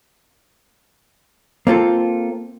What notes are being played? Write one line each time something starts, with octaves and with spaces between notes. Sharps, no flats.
A#3 C4 F4 A4